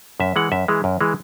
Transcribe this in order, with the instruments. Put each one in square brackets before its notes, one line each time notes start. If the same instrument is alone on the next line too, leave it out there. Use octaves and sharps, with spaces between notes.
[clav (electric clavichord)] F#2 E5
E3 G#3 F#5
F#2 E5
E3 G#3
F#2
E3 G#3